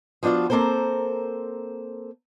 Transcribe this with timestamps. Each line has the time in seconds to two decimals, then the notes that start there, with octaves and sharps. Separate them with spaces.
0.23 F3 B3 D4 F4 F#4
0.50 A#3 C4 A4 A#4 C5